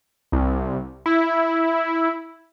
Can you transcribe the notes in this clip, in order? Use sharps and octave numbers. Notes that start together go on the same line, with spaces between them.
C2
E4